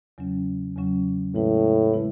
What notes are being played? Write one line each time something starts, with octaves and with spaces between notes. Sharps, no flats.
E2 C#3 F#3 C#4
E2 C#3 F#3 C#4
A2 C#3 G#3 B3 E4 B4
C#3 G#3 B3 E4 B4